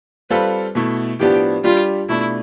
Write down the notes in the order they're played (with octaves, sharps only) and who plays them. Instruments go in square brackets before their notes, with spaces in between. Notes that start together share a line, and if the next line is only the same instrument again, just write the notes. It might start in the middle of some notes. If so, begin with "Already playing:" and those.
[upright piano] G3 C4 F4 A4 [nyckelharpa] B4
[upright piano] B2 A3 E4
[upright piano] A2 F3 B3 D4 [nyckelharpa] G4
[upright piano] G3 D4 G4 [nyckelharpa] F4
[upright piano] B2 A3 D4 [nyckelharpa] E4